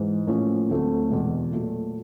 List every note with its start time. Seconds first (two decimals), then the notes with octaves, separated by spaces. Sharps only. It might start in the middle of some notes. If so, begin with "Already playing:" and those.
Already playing: G#2 E3 G#3
0.27 A2 F3 A#3 C#4 F4
0.69 D2 D3 F#3 A3 C4
1.10 E2 B2 G#3
1.51 A#2 F#3 A3